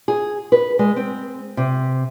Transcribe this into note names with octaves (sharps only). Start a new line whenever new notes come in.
G#4
B4
G#3
C4
C3